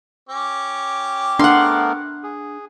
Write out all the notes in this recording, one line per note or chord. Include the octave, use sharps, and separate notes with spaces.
C#4 G4 D6
A3 B3 D4 A#4 F#5 C6
G#4